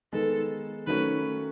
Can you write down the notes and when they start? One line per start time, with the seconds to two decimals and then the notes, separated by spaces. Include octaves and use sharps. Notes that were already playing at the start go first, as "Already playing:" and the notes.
0.13 D#3 G#3 B3 A4
0.87 D#3 F#3 A3 C#4 B4